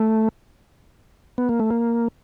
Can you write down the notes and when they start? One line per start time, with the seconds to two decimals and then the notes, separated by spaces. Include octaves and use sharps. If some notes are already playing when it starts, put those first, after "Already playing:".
Already playing: A3
1.38 B3
1.49 A#3
1.60 A3
1.71 A#3